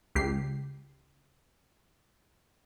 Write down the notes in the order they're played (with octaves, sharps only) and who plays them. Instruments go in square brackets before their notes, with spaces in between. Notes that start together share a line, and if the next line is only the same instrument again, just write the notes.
[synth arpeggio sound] C#2 G4 C7